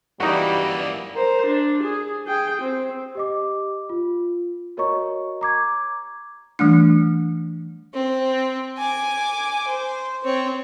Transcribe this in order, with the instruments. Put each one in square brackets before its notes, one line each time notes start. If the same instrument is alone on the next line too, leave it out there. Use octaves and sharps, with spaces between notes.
[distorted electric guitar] F#2 A#3 [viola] E3 D5 [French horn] G3 [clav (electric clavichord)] D#4 F#4
[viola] A#4 C5
D4
G#4
G#4 G5
C4
[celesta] G4 D#5 D6
F4
F#4 A#4 C#5 D#5 A#5 C#6
A#5 D6 G#6
[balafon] E3 G3 A3 D4
[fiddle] C4
G#5 D6
C5
C4 C#5